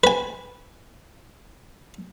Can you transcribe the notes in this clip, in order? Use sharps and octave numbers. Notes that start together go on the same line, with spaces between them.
B4 G#5